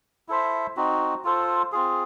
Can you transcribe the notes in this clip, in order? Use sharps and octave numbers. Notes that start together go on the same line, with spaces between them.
E4 A4 C5 E5
C4 D#4 F#4
F4 A4 C5
C4 F4 G#4